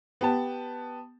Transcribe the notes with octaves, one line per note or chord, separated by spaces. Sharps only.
B3 G4 A5